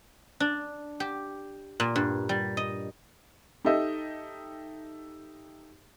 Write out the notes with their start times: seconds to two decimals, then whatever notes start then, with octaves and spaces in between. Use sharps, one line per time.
0.40 D4
1.00 G4
1.80 A#2
1.96 G2
2.29 G3
2.57 D#5
3.65 D#4 G4 A4 D#5 E5